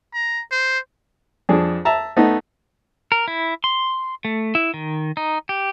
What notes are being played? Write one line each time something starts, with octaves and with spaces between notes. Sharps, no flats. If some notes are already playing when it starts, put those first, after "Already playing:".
A#5
C5
F2 D4 G#4
E5 A5 A#5
A3 B3 D#4
A#4
E4
C6
A3
E4
D#3
D#4
G4